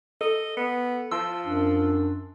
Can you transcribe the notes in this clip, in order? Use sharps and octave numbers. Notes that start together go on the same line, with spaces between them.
A4 D#5
B3
F3 A5 C6 E6
F#2 D4